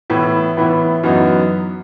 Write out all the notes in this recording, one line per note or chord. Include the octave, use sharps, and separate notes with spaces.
A2 E3 B3 E4
A2 E3 B3 E4
F#2 E3 B3 D#4 F#4